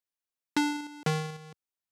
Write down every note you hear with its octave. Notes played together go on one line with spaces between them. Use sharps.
D4
D#3